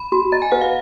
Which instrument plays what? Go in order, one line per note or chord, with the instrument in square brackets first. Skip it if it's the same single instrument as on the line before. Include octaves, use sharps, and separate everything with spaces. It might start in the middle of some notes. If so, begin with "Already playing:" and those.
Already playing: [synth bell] B5
[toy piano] F#4 [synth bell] B5
[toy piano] D#5 [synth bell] A#5
[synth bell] G#5
[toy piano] B4 [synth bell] F#5
[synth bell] F5